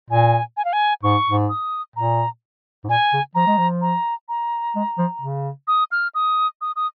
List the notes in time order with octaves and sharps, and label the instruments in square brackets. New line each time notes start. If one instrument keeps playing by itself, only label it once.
[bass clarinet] A#2 [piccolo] G#5
[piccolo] G#5
F5
G#5
[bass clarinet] G#2 [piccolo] C#6
[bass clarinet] G#2
[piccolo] D#6
[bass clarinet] A#2 [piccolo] A#5
[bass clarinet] G#2
[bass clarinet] A#2 [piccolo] G#5
[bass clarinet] C#3
[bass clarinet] F3 [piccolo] A#5
[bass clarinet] G#3
F3
[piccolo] A#5
A#5
[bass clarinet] G#3
F3
C#3
[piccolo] D#6
F6
D#6
D#6
D#6